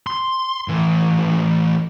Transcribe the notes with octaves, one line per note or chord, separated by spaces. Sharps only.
C6
A2 E3